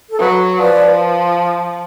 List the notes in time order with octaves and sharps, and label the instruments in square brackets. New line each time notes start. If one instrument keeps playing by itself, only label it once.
[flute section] A4
[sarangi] F#3 [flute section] B4
[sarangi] F3 [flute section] B4 D5